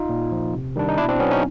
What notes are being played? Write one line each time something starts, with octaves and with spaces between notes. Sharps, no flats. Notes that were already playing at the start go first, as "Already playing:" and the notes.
Already playing: D#4 F4
A#2
F3
C3
D#3 G3 D4
D#4
B2 D4 E4
C4 D4
F#3 B3 C#4
C#4 D#4